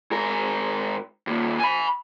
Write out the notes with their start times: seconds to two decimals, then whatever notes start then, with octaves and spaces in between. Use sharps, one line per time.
0.11 G#2 A#4
1.27 D#2 A#2
1.60 G#5 B5